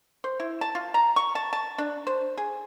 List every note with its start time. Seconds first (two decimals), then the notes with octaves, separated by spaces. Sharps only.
0.24 C5
0.40 E4
0.61 A5
0.75 F4
0.94 A#5
1.16 C#6
1.35 A5
1.53 A5
1.78 D4
2.07 C5
2.37 G#4